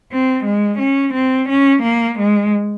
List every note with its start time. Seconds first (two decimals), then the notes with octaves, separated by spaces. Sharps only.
0.10 C4
0.44 G#3
0.79 C#4
1.14 C4
1.49 C#4
1.83 A#3
2.17 G#3